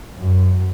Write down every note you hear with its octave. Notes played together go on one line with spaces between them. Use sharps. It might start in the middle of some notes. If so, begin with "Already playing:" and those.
F#2